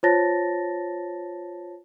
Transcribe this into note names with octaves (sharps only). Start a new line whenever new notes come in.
F4 C5 C#5 A5 A6 A#6